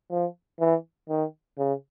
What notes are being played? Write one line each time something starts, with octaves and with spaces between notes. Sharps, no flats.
F3
E3
D#3
C#3